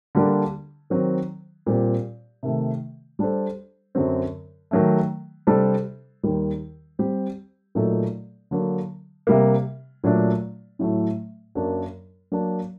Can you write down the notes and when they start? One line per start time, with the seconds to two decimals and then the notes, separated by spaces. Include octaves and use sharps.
0.15 D3 G3 A#3 D4
0.90 D#3 F#3 C4
1.66 A#2 G3 C4 G4
2.43 C3 D#3 A3
3.19 G3 D4 A4 C5
3.95 F#2 D3 F#3 C4
4.71 D#3 F#3 A3
5.47 C3 G3 D4 A4 C5
6.23 D#2 D#3 G3
6.99 G3 C4 G4
7.75 A#2 F#3 A3 D#4 A4
8.51 D3 F#3 A#3
9.27 C3 G3 A#3
10.04 A#2 F#3 A3 D4
10.79 A2 F#3 A3
11.55 F#2 F#3 A#3 D4
12.32 F#3 A#3 D4